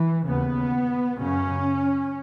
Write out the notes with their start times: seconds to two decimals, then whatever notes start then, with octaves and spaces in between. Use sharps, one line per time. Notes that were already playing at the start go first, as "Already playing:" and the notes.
Already playing: E3
0.26 D#2 C#3 B3
1.18 F#2 C#3 C#4